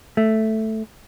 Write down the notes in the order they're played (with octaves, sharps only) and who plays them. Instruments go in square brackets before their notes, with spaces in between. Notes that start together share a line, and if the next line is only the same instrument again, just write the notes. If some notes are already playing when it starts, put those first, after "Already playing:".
[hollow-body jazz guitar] A3